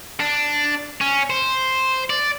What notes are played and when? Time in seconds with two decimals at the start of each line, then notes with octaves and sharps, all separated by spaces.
0.20 D4
1.01 C#4
1.30 C5
2.10 D5